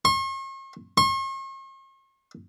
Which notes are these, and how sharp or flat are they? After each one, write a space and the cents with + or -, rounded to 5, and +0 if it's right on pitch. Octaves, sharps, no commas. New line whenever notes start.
C#6 -45
C#6 -45